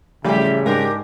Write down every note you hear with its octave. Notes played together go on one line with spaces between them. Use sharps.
A1 C#3 F3 G3 G4 E5
G#2 D4 G4 A#4